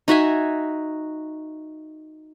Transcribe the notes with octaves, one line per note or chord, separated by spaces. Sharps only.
D#4 F#4 E5 G#5